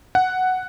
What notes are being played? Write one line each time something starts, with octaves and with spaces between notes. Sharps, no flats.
F#5